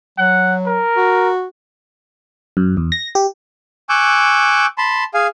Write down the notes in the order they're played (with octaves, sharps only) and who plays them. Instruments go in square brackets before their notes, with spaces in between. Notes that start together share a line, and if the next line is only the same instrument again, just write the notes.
[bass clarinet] F#3 [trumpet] F#5
[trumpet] A#4
[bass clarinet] F#4
[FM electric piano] F#2
E2
A#6
G4
[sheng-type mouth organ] G#5 C#6 D6 E6 F#6 G6
A5 B5 C6
G#4 F5 G#5